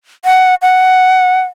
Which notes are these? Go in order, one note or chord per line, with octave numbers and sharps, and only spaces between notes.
F#5
F#5